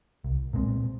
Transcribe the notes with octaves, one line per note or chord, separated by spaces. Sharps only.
C2
A#2 G#3 C4